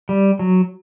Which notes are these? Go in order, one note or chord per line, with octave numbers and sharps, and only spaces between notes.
G3
F#3